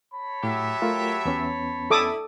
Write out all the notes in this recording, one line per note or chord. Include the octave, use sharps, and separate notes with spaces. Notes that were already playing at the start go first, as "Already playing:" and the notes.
C#5 A5 B5
A2 F#3 G4 E5
A3 F4 A#4
E2 B3 C#4
E4 A4 D6 D#6